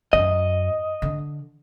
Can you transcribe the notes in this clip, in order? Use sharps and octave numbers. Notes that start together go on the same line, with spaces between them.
F#2 D#5
D3